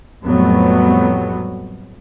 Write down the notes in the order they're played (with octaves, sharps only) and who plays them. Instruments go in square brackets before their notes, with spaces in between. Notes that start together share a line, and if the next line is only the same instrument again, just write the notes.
[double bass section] F2 A2 F#3 G3 A3 B3